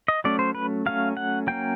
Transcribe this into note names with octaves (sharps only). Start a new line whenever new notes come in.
D#5
F#3 A3 C#4 D5
C5
B4
F#3 A3 C#4 F5
F#5
F#3 A#3 C#4 G5